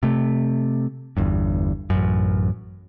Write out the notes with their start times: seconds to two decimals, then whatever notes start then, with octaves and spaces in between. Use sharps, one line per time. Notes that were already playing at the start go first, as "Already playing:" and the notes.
0.03 C3 A3
1.17 G1 E2 G2
1.90 A1 F#2